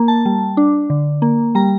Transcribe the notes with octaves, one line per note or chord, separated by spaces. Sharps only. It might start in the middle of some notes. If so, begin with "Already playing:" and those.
Already playing: A#3
A5
G3
D4
D3
A#3
G3 A#5